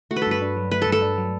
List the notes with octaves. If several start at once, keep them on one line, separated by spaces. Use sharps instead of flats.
A3 F#4
B4
A4
G2 B4
D4
F#3
A3 B4
G2 A4
A4
D4
F#3